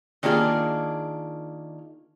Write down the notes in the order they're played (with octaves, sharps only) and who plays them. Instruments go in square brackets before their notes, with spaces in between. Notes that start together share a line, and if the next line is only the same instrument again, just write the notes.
[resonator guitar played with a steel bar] D#3 A#3 D4 F4 G#4